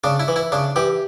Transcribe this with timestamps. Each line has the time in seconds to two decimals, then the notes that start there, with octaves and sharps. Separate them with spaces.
0.04 C#3 D4
0.20 E4
0.28 E3
0.36 E4
0.52 C#3 D4
0.76 E3 G4